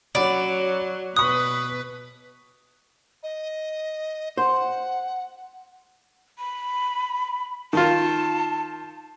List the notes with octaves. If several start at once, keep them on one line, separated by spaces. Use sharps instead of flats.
F#3 C#4 D5 F#5 B5
B2 B4 C#6 D#6 F#6
D#5
C5 F#5
B5
D#3 F4 A5